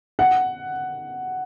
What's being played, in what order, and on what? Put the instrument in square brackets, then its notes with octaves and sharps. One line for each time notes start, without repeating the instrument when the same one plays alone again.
[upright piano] F#5